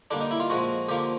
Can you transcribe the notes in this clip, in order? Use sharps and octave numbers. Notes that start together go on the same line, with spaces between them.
D3 G3 A#3 D4
D#4
E4
F4
A#2 F3 G#3 F#4
D3 F3 A#3 G4